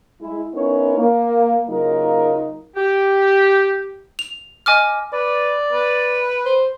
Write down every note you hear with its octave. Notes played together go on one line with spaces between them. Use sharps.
G#3 E4
B3 C#4 D#4 E4 A#4 C#5
A#3
C#3 F#3 A#3 D#4 F4 A#4
G4
F7
D#5 G#5 D6 F6
B4 D5
B4
C5